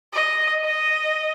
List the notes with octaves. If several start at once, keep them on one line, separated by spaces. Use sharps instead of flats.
D#5
D#5